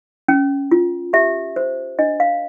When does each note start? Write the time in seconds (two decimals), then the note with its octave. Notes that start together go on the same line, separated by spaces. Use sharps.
0.28 C#4
0.71 F4
1.13 G4 E5
1.56 C5
1.99 D4 D#5
2.20 F5